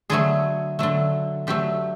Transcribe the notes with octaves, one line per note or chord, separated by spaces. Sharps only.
D3 F#3 A3 G#4
D3 F#3 A3
D3 F#3 A3 G4